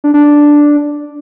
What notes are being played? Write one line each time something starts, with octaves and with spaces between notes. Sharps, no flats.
D4
D4
D4